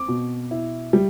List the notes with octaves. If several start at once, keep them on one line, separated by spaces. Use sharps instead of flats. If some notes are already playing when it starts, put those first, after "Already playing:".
Already playing: C4 D6
B2
E4
G3